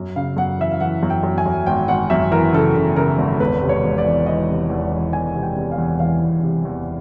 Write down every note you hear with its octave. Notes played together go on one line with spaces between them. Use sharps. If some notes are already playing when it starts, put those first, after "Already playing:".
Already playing: F#2
C#3 F5
F#2 F#5
E3 E5
F5
E3 F#5
F#2
G5
F#2
G#5
F#2
G#1 G5
G#1 F#5
F#2 E5
E3 A#4
C#3 A4
C#3
C#3 A#4
G#1
E1 B4
C3
C#5
E1
D5
E3
E3 D#5
C3
E2
E3
E2 G#5
C3
G5
C3
F5
E2
E3 F5
E2
C3
E2